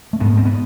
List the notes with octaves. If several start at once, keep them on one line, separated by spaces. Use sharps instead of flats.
A3
G#2 B3
C4
B3